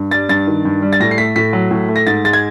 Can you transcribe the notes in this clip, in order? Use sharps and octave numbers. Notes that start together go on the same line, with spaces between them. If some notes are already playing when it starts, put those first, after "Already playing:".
Already playing: G2
G3 A6
G2 A6
D#3
G2
G3
A6
A2 A#6
C7
A3 B6
A2 B6
F#3
A2
A3
A#6
G#2 A6
G#3 A6
G#6